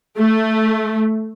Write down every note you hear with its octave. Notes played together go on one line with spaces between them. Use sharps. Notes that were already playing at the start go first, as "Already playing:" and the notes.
A3